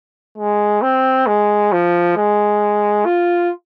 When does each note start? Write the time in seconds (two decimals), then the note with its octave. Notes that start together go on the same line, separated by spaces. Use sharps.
0.38 G#3
0.82 C4
1.27 G#3
1.72 F3
2.17 G#3
3.06 F4